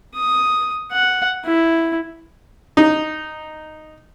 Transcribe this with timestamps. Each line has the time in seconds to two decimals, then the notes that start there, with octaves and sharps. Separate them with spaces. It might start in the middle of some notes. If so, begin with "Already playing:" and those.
0.15 D#6
0.92 F#5
1.45 E4
2.77 D#4